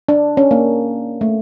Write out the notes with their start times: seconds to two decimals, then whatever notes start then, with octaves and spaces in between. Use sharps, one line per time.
0.09 D4
0.37 C#4
0.51 A#3
1.21 A3